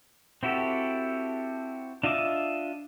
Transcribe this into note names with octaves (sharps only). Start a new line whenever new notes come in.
C4 E4 F#4 G4 A4
D4 F4 D#5 E5 D6